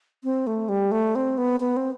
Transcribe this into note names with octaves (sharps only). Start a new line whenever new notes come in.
C4
A3
G3
A3
C4
B3
B3
C4